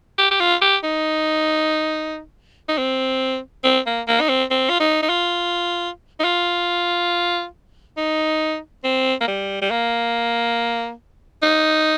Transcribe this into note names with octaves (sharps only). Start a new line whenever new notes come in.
G4
G4
F4
G4
D#4
D#4
C4
C4
A#3
A#3
D#4
C4
C4
F4
D#4
D#4
F4
D#4
F4
D#4
C4
A#3
G3
G3
A#3
D#4